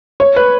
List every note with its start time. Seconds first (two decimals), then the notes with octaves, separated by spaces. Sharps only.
0.20 C#5
0.36 B4